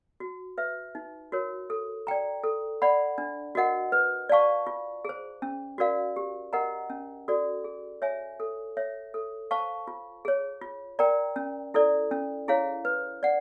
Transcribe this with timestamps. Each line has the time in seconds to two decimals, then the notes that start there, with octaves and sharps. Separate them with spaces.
0.20 F#4
0.58 B4 E5
0.95 D#4
1.32 F#4 A#4 C#5
1.70 A4
2.07 D5 G5 A#5
2.43 A4
2.82 D5 F#5 B5
3.18 D4
3.55 F#4 A#4 D#5 F#5
3.92 B4
4.29 D5 F5 A5 C#6
4.67 F4
5.05 G#4 C5
5.42 C#4
5.78 F#4 A#4 D5 F5
6.16 G4
6.53 A#4 D#5 F#5 A#5
6.90 C#4
7.28 F#4 A4 D5
7.64 G#4
8.02 C#5 E5 G#5
8.40 A4
8.77 C#5 E5
9.14 A4
9.51 C5 F5 A5 C#6
9.88 F4
10.25 G#4 C#5
10.62 F4
10.99 A#4 D5 G5 A#5
11.36 C#4
11.74 E4 A4 D5
12.11 C#4
12.48 E4 G#4 C#5 F5
12.85 B4
13.23 D5 F#5